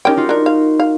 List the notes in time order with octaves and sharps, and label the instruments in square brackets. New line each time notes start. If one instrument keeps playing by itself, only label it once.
[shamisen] C#4 G5 [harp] D#4 G4 A#4
[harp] D#4 F4 F#4
[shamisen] D4 A#4
F5
F5